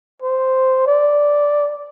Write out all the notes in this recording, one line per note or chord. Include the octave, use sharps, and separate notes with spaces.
C5
D5